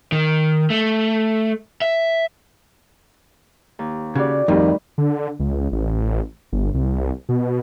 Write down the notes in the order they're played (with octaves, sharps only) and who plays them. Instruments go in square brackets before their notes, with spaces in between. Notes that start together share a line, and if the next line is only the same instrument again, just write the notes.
[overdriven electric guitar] D#3
A3
E5
[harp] D#2
[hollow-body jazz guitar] C#3 [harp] F#4 G4 D5
[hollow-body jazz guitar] F2 [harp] A2 G3 B5 [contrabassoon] D#3
[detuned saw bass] D3
C#2
A1
G1
C2
B2